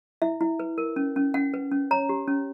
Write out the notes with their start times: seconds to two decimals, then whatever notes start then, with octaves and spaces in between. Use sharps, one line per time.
0.22 E4 E5
0.41 E4
0.60 B4
0.78 A#4
0.96 C#4
1.16 C#4
1.34 C#4 F#5
1.54 B4
1.72 C#4
1.91 C#5 A#5
2.09 G4
2.28 C#4